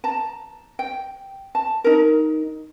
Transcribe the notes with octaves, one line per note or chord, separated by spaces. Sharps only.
A5 A#5
G5
A5
D#4 A#4